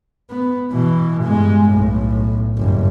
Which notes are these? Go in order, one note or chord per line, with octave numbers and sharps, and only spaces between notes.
B3
B2 E3
G2 G#3
B1 A2
F#1 G2